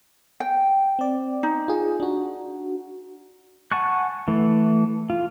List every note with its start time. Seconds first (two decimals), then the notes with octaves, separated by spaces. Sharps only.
0.40 G5
0.99 C4 D5
1.43 D#4
1.68 F4 G#4
2.00 D4 F#4
3.72 F#5 G#5 A5 C#6 F#6
4.28 E3 A3
5.10 F4